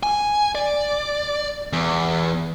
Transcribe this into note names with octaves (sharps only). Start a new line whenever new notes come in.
G#5
D5
E2